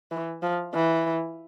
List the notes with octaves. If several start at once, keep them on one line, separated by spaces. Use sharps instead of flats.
E3
F3
E3